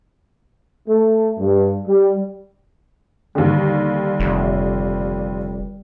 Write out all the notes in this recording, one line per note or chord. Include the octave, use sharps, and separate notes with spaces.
A3
G2
G3
D#2 D3 G3
F1